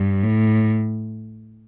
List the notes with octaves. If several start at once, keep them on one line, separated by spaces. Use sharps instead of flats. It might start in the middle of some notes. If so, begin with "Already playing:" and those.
Already playing: G2
A2